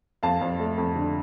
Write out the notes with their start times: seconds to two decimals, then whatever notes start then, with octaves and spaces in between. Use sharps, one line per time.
0.23 F2 F5 A5
0.41 F2
0.59 A3
0.78 F2
0.96 D3